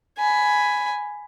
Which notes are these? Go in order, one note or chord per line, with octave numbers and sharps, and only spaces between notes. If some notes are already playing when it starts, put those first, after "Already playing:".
G#5 B5